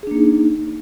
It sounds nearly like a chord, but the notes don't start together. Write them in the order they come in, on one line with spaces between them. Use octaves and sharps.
G#4 D4 A#3 D#4